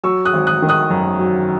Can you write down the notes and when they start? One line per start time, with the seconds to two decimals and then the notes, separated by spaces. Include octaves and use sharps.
0.03 F#3 C#6 E6
0.25 D#6 F#6
0.33 G#1
0.47 D#6 F#6
0.62 D#3
0.69 D#6 F#6
0.90 F#2
1.19 F#3